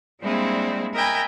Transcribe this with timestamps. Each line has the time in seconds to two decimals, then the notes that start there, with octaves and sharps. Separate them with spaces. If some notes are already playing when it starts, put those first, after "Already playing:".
0.22 G3 G#3 A#3 C4 D4 E4
0.94 A#4 D#5 E5 G5 G#5 B5